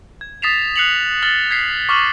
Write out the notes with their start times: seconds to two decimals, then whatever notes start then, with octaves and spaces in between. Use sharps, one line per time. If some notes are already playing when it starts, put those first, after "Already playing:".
0.21 G#6
0.42 D#6 A6 B6 C7 E7 F7
0.76 F#6 C7 C#7 F7 F#7
1.22 F6 A6 F#7 G7
1.51 G#6 B6 C7
1.89 C#6 D6 F6 E7 F#7